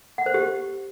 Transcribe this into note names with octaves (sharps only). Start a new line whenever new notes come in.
F#5
C5
G4